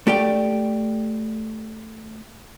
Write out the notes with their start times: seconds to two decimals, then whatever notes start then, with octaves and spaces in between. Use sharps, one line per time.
0.07 A3 G4 D5 G5